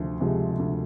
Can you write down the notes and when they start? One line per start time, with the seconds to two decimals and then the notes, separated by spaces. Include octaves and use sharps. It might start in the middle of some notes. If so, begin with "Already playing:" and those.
Already playing: D2 C3 F3
0.20 C3 F3 G#3
0.59 D2